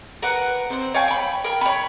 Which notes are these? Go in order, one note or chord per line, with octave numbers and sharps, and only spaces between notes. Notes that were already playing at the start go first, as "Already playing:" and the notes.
A#4 B4 F#5
C4 C5
C#5 F5 G5 G#5
G5 B5
A#4 G5
C#5 B5